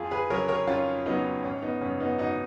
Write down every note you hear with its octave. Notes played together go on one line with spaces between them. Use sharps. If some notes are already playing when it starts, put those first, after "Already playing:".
Already playing: F2 F4 G#4
G#4 B4
C#3 F#3 A#4 C#5
A#4 C#5
F2 C#4 F4
C#3 F#3 B3 D#4
G#1 C#4
B3 D#4
F#2 C#3 C#4
B3 D#4
G#1 D#4 F#4